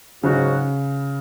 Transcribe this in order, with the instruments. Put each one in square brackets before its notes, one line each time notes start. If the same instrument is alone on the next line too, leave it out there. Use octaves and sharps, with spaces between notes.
[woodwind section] G#2 F#3 C#4 F#4 [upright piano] C#3